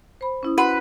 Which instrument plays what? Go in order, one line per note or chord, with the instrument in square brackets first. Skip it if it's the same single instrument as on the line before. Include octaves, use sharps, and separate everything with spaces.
[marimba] C5 B5
C#4 E4 D#6
[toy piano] F#4 F#5 [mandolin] B4